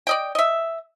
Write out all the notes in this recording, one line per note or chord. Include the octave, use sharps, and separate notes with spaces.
D5 D#5 G5
D#5 E5